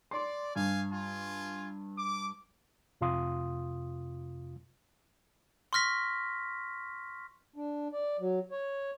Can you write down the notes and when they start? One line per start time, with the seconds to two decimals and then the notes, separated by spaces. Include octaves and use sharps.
0.11 D5 C6
0.56 G2 F5 G#5
0.92 F4 G#5
1.98 D6
3.01 F2 C3 F4 F5 C6 D#6
5.73 C6 C#6 F6 A#6 B6
7.56 D4
7.92 D5
8.19 F#3
8.51 C#5